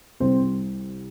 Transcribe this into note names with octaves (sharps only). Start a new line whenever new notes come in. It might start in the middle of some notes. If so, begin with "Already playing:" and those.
C2 C3 G3 C4 C5